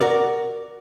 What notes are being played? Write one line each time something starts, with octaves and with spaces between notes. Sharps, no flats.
F#4 A#4 D5